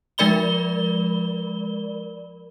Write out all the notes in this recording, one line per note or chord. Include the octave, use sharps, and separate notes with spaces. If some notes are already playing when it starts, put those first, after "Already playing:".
F3 G#3 A#4 D5 B5 G7